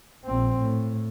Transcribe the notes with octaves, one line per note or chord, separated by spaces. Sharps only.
A#1 C4
A2